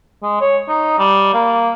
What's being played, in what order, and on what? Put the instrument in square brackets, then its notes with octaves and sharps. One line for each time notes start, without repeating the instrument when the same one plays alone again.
[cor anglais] G#3
C#5
D#4
G3
A#3